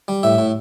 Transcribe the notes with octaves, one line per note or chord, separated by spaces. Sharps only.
G3
A2 E5
A2